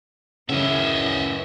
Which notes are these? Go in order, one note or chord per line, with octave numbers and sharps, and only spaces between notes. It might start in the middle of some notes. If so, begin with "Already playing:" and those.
F#2 C#3 B3 C#4 E4 D#5 E5